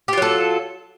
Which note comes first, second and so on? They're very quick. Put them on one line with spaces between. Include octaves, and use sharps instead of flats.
G4 F4 F#3 A4